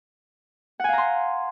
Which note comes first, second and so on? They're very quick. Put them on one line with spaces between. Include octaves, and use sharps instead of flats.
F#5 G#5 F5 A#5 C6